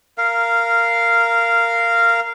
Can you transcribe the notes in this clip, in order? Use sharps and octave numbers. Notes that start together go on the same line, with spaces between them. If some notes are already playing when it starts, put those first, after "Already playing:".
A#4 F5